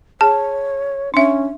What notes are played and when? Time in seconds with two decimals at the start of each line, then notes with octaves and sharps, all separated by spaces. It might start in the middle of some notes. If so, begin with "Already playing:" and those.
0.21 G#4 C#5 A5
1.14 C#4 D4 E5